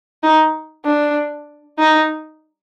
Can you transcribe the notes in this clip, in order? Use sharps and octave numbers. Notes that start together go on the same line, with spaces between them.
D#4
D4
D#4